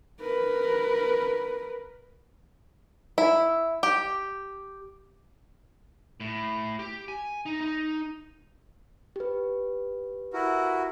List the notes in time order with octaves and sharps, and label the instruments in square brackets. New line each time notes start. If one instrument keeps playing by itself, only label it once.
[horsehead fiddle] A#4 B4
[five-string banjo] E4
G4
[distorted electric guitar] A2
G4
G#5
D#4
D#4
[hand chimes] G4 B4
[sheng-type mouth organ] E4 F#4 A#4